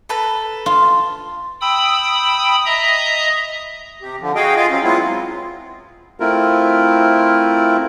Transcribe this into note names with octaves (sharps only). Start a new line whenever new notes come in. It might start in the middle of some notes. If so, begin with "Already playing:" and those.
A4 B4 A#5
F4
G5 B5 D#6 E6
D#5 E5 A#5 D#6
C3 G4
D3 F3
F#4 G#4 D#5 F5 G5
F4 G#4 D#5 F5
F#3 C4 C#4
F#3 G#3 B3 C4 E4 F4
A3 C4 E4 F4 A#4